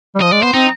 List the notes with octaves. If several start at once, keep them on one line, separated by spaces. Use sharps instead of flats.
G3
F3 D#5
G#3 D5
B3 C5
C4 D#4